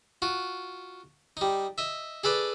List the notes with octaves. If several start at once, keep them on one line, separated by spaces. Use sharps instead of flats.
F4 F#4
G3 D#4
D#5 E5
G#4 A4 B4 D5